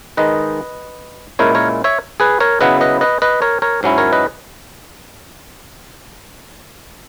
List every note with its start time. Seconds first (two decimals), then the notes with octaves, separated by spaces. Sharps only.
0.17 D#3 G#3 D#4 B4 D#5
1.39 A#2 G#3 C#4 E4 A#4 C#5
1.55 A#4 C#5
1.84 C#5 E5
2.20 G#4 B4
2.40 A#4 C#5
2.61 C#3 F#3 B3 E4 B4 D#5
2.81 B4 D#5
3.01 B4 D#5
3.22 B4 D#5
3.42 A#4 C#5
3.62 A#4 C#5
3.83 G#2 F#3 C#4 E4
3.98 A#4 C#5
4.12 B4 D#5